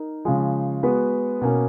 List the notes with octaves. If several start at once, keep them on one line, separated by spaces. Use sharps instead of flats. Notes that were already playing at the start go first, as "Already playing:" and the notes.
Already playing: D#4 A#4
C#3 F3 G#3
G#3 B3 F#4 B4
B2 A#3 C#4